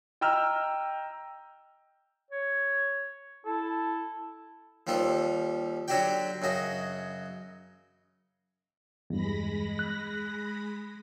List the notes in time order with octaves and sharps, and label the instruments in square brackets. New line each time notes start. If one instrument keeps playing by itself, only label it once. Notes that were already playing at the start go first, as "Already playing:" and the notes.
[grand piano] D#5 G5 A#5 E6 F6
[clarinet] C#5
[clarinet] E4 [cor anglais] A4
[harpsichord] D#2 F3 G3 F4 A4
D3 F#3 F#4 G4 D5 G5
F#2 C#3 F#4 D#5
[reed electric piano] E2 G2 [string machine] G#3 B5 A#6
[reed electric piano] F#6